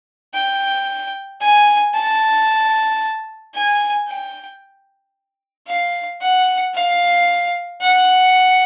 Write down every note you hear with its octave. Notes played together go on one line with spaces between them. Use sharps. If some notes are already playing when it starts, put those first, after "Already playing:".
G5
G#5
A5
G#5
G5
F5
F#5
F5
F#5